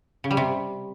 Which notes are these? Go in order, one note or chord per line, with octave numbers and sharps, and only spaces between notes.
C#3
G3
C3